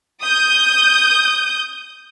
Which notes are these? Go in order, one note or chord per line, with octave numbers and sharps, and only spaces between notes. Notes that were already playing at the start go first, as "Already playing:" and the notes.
D#6 G6